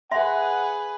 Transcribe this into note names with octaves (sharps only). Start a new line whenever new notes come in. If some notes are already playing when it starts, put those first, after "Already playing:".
G#4 B4 E5 F#5 C6